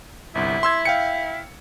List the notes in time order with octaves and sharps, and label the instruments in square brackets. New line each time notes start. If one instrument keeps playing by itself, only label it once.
[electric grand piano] G1 C2 [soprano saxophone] E4
[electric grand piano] C6 E6 G#6
F5 G5 C#7